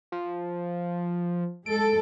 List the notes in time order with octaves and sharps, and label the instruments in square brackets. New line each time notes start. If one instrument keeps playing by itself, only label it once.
[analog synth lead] F3
[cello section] G#3 A4 [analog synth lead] D7